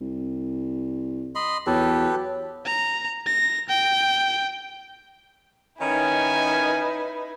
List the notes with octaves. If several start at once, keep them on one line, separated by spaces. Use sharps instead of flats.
C2
D#5 B5 C6
E2 F#3 G4 A4 B4
A#5
A#6
G5
D#3 C#4 D#4 E4 B4 G#5